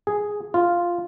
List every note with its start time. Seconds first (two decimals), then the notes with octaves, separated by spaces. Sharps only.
0.07 G#4
0.54 F4